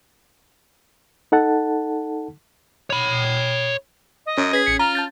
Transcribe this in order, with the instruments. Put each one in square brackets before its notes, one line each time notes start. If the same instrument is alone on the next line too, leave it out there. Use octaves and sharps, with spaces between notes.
[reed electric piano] D#4 A4 F#5 A5
[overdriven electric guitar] C#5 B5
[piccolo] D#5
[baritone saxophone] F#2 [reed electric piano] C#4
[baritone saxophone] G#4 [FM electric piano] B4 B6
[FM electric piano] A1 B6 [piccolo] C#7
[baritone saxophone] F4 [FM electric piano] A#5 [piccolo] F6
[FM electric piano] A5 G6 A6